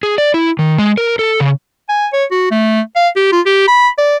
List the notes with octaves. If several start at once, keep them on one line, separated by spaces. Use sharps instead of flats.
G#4
D5
E4
D#3
G#3
A#4
A4
C#3
G#5
C#5
F#4
A3
F5
G4
F4
G4
B5
D5